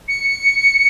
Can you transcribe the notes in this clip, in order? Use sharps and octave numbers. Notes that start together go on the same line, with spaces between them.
C#7